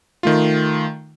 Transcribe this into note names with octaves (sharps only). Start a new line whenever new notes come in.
D#3 A3 F4